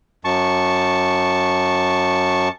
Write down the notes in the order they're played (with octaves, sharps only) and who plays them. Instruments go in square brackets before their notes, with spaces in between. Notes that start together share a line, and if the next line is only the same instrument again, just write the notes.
[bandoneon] F#2 A5 C#6